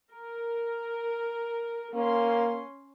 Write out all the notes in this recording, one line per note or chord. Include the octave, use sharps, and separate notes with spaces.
A#4
A#3 C#4 C6